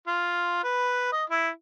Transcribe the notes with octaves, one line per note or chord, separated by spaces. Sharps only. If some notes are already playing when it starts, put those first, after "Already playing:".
F4
B4
D#5
E4